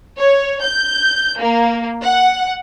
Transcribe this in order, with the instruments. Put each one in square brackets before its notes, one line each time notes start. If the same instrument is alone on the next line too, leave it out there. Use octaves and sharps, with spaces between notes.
[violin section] C#5
G6
A#3
F#5